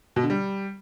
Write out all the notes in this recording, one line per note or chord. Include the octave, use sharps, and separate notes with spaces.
B2
D3
G3